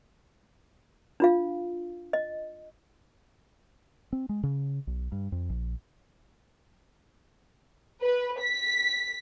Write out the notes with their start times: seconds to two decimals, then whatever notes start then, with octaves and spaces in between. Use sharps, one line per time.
1.20 D4 F4 F5
2.13 D#5
4.13 C4
4.29 G#3
4.43 C#3
4.87 B1
5.12 G2
5.32 F2
5.50 A#1
8.02 B4
8.42 B6